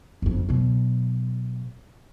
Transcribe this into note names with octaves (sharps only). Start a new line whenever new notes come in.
G1 F2
B2 F#3